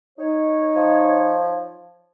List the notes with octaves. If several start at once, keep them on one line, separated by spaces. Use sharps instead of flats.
D#4 C#5
F3